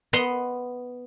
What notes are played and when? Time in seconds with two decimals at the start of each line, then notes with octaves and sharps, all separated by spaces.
0.13 B3 D#5 C6